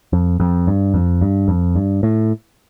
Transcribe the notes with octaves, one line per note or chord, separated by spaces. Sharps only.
F2
F2
G2
F2
G2
F2
G2
A2